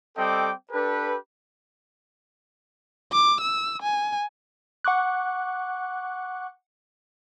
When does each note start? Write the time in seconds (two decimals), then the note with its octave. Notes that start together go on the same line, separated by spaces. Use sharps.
0.17 G3 C4 A4 D#5 G5 D6
0.72 D4 G4 A4 B4
3.12 D6
3.41 E6
3.82 G#5
4.84 F#5 C#6 D6 F#6